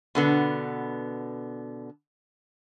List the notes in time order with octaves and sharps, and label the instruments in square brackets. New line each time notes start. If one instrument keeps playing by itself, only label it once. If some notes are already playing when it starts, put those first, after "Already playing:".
[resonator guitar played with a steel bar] B2 D3 B3